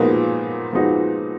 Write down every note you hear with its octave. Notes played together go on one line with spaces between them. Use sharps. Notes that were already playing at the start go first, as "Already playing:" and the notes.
Already playing: A#2 F3 G#3 A#3 B3 D#4 F#4
F3 G#3 B3 D#4 F#4